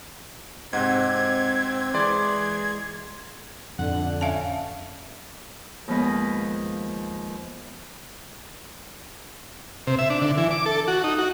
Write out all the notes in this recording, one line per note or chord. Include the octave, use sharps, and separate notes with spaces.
G#2 C3 C4 D#5 F#5 F#6 G#6
E3 G#3 D5 C6
F2 A2 D3 F3 F#5
C#4 E5 F5 A5
D#2 F3 G#3 B3 B4 D#5
C3
E5
D4
D3
E3
D6
A4
F#4
D#4
F#4